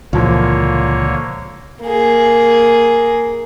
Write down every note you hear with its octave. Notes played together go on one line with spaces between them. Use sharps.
C#2 A#2 D3 E3 F3 A#3 C#5
A#3 G#4